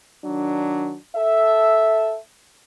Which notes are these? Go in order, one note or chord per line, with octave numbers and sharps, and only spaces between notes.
D#3 F#3 D4
A4 E5